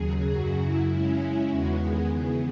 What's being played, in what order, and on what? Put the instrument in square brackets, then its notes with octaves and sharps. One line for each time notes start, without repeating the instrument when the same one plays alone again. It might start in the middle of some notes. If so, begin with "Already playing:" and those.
Already playing: [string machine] D#2 C#3 F#3 G#4
F#2 C#3 F#3 F#4
E4
C#3 G#3 C#4
E2 D#3 G#3 B3 F#4
G#4
C#3 E3 B3 G#4